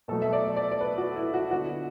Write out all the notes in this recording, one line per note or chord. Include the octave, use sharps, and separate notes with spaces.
B2 F#3 A3 A4
E5
D5
D5
D5
B4
F#4
E4
F#4
D3 B3 F#4